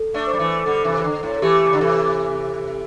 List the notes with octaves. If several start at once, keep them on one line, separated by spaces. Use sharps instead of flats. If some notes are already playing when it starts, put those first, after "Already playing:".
Already playing: A4
A3 D4
C5
G3
E3 A3
D3 G3 A4
C3 E3
E3
D3
A2
A4
E3 A3 G4
C3
D3
C3 E3 A4